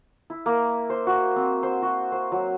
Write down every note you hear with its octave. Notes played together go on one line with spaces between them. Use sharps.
E4
A#3
C5
F#4
C4
C5
F#4
C5
F#3